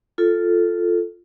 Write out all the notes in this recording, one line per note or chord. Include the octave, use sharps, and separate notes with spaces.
F4 A4